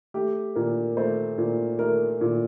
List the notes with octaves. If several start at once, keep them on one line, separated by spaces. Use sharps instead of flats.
A3 G4
A#2 A#4
A3 C5
A#2
A3 A#4
A#2